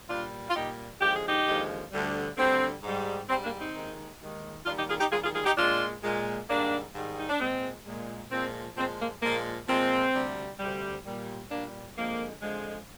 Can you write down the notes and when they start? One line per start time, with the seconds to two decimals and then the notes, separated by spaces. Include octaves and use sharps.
0.09 A#2 G3 D4 F4
0.49 F4
0.54 A#2 G3 D#4 G4
1.00 D#2 D3 F3 G#3 G4
1.13 G#4
1.26 D#4 G4
1.46 D#2 D3 F3 G#3
1.92 D2 D3 G3
2.37 D2 D3 G3 C4
2.83 G#2 G3
3.29 G#2 G3 C4
3.43 A#3 D4
3.59 C4 D#4
3.75 D#2 D#3 G#3
4.20 D#2 D#3 G#3
4.65 D#2 D#3 G3 D4 F4
4.77 D#4 G4
4.88 F4 G#4
5.00 D#4 G4
5.11 D#2 D#3 G3 F4 G#4
5.22 F4 G#4
5.34 F4 G#4
5.45 D#4 G4
5.56 A#2 G#3 D4 F4
6.03 A#2 G#3
6.48 G#2 D#3 G3 A#3 D4
6.93 G#2 D#3 G3
7.18 D#4
7.29 D4
7.39 A#2 G#3 C4
7.85 A#2 G#3
8.30 A#2 F3 G#3 C4
8.76 A#2 F3 G#3 C4
8.99 A#3
9.22 A#2 F3 G#3 A#3
9.68 A#2 F3 G#3 C4
10.13 D2 C3 G3
10.58 D2 C3 G3
11.05 A#2 G3
11.50 A#2 G3 A#3 D4
11.96 F2 D3 F3 G#3 A#3
12.41 F2 D3 F3 G#3